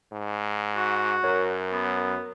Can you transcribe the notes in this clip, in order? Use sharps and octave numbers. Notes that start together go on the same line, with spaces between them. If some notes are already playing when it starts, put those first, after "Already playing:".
G#2
F#4
F#2 A#4 C#5
B3